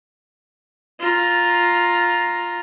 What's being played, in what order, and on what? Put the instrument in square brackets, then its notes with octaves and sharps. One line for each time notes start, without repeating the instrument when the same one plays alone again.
[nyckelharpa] F4 A#5